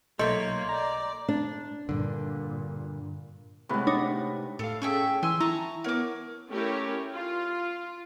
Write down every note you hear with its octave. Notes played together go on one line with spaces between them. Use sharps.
B1 A#3 A4 C#5 D#5 E5 C6 G6
D5 A#5
D4
G2 A#2 D3
A2 C3 G#3 B4 F#5
D4 D#4 C#5
A2 A4 F5
C#4 G#4 A4 E5 G5 C#6
E3 G#5 C6 E6
E4 A5 A#5 C#6
B3 A#4 C#5 F#5 D6
A3 C#4 E4 G4 A#4 C#5
F4